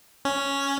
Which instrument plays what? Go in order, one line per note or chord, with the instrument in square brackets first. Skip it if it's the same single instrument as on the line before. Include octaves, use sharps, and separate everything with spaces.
[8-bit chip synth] C#4